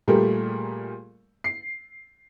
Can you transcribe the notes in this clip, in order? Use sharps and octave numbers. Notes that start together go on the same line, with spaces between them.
A#2 G3 A3 G4 G#4 A#4
C7